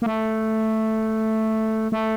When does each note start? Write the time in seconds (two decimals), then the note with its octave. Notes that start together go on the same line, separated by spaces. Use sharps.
0.02 A#3
0.06 A3
1.92 A3